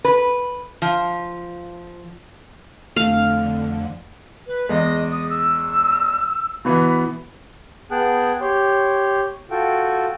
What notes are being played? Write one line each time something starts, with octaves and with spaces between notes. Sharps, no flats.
B4
F3
F2 D3 A3 F5
B4
E2 G#3 D#5
D#6
E6
B2 E3 B3 B5
B3 G#4 G5 A5 F#6
G4 C#5 C6
F4 F#4 A4 G5